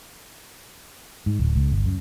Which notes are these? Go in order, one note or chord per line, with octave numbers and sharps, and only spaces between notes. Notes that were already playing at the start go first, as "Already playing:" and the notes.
G#2
D1
C#2
G1
F#2